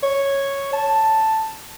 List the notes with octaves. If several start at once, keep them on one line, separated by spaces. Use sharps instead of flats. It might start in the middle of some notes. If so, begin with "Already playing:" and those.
C#5
A5